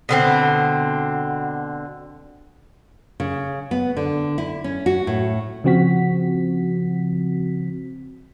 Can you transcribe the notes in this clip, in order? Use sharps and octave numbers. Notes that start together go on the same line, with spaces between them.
B2 D3 C4
C#3
B3
D3
E4
C#4
F#4
A2
C#3 F3 C4 F#4 B6